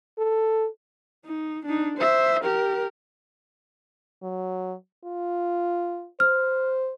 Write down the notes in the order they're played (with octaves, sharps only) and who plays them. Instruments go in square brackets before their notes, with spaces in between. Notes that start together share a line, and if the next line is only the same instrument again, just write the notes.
[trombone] A4
[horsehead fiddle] D#4
D4 D#4
C5 E5
G4 A#4
[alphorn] F#3
F4
[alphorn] C5 [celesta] F6